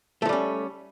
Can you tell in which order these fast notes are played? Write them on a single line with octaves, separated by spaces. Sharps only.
A3 F3 G3 C#4